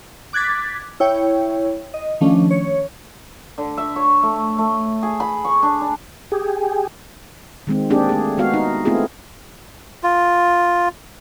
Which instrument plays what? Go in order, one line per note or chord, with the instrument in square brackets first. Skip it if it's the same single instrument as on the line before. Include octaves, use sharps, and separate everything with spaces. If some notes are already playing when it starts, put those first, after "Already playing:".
[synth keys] D6 F#6 G#6 A6 B6
E4 C#5 G5
D#5
D#3 F3 A3 C#4 D4
C#5
[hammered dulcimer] D3
E5
C#5
A3
A3
G#4
B5
C#6
D4
D4
[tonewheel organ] G4 G#4
[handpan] D#3 G#3 C4
A#3 C4 D4 G4 G#4
A3 G#4
G#3 B3 F#4 F5
D#4
A3 B3 C4 E4 F4 G#4
[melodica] F4